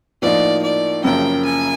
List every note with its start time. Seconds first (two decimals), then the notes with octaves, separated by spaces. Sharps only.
0.22 A2 F3 A#3 D#4 D5
0.63 D5
1.04 F#1 F#2 C#3 F3 A#3 G5
1.45 G#5